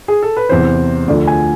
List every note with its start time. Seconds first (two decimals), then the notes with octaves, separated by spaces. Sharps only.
0.08 G#4
0.22 A4
0.37 B4
0.49 E2 C3 E3 C5
1.08 D2 D3 F3 D5
1.27 G#5